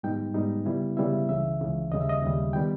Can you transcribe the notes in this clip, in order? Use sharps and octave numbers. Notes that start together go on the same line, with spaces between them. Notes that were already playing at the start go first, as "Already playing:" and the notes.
G#2 G3 B3 D#4 G5
G#2 G3 B3 D#4
C#3 G3 B3 E4
C#3 G3 B3 E4 E5
C#2 C#3 E3 E5
C#2 C#3 E3
D#2 C#3 G3 D#5
E5
D#5
D#2 C#3 G3
D#3 G3 B3 G5